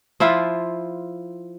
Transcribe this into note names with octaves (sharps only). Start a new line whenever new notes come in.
F3 E4 F4 E5